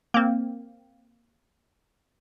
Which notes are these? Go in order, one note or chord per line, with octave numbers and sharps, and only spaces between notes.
A#3 C4